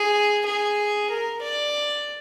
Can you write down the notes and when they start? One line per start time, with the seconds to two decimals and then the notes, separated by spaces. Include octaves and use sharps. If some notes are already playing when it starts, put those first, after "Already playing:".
Already playing: G#4
0.46 G#4
1.11 A#4
1.43 D5